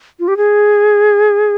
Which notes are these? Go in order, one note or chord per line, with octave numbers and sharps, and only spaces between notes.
F4
G4
G#4